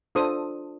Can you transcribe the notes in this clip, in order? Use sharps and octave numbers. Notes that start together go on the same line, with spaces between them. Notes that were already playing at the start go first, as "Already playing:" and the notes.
D4 F4 A4 C5 D#6